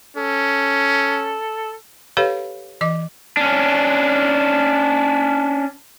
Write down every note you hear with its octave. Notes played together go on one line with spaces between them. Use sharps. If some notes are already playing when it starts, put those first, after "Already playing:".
C#4 A4
G4 A4 B4 C#5 F5 B5
E3 D#5 D6
C#4 D4